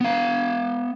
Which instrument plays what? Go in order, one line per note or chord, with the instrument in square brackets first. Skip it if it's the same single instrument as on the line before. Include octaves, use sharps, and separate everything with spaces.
[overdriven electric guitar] B3 F5